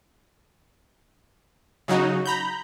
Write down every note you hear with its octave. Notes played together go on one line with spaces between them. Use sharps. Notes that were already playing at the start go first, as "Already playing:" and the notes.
C#3 F#3 D#4 F#4
A#5 B5 G6